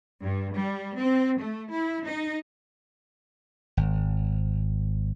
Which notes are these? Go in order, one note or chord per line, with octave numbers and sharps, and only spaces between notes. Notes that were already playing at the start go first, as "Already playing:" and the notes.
G2
G3
C4
A3
E4
D#4
G#1